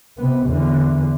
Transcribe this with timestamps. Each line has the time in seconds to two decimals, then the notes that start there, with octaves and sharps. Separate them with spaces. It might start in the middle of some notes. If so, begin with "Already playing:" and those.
0.18 C3 B3
0.47 E2 D3